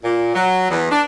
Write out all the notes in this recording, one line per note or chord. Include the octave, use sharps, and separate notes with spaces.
A#2
F#3
E2
D4